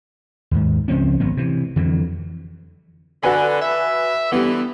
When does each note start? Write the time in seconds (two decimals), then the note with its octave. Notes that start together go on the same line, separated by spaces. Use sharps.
0.51 D#2 G#2
0.88 C#2 F3 C4 C#4
1.20 G#1 F#3 B3
1.37 C3 E3
1.76 F2 D3 E3 F#3
3.24 D3 F#4 B4 G#5
3.61 E5
4.32 D3 E3 G3 B3